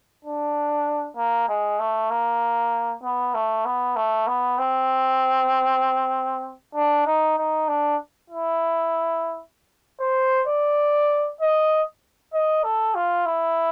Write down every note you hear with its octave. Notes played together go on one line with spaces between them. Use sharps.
D4
A#3
G#3
A3
A#3
B3
A3
B3
A3
B3
C4
D4
D#4
D#4
D4
E4
C5
D5
D#5
D#5
A4
F4
E4